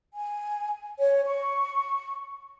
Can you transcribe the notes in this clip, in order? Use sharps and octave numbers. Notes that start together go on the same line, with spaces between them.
G#5
C#5
C#6